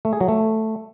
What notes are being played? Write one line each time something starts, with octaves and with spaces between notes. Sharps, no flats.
A3
G#4
F#3
A3